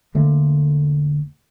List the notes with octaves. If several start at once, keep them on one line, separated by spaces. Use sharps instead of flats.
E1 D3 A3 A#3